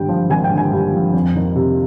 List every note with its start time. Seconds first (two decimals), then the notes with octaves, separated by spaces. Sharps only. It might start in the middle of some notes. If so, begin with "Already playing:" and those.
Already playing: G#1 G2 D3 G5
0.09 F3
0.30 G#1 G#5
0.44 G5
0.51 D3
0.58 G#5
0.72 G2
0.94 F3
1.13 F2
1.35 D#3
1.55 C3